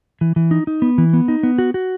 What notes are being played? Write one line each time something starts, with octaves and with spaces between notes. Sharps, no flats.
E3
E3
D#4
D#4
B3
E3
B3
D#4
B3
F#4
F#4